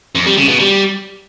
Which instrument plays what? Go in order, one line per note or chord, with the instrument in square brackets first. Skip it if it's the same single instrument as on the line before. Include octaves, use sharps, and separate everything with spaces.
[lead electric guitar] F2
G3
C#3
B2
G3